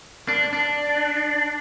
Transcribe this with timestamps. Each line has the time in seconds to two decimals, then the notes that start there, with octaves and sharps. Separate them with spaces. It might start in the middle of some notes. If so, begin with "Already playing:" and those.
0.28 D4
0.53 D4